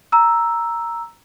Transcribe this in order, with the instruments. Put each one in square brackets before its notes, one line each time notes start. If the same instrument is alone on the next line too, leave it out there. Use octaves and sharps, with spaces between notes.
[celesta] A#5 E6